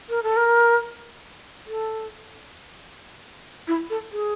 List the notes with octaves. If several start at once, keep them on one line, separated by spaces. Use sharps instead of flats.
A#4
A4
A#4
A4
E4
A4
G#4